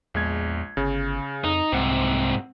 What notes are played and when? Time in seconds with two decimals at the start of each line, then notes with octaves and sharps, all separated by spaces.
0.14 A#1 E2 G#3 G#6
0.77 G1 C#3
1.44 F2 D#4
1.72 C2 G#2 C3 C4 F#5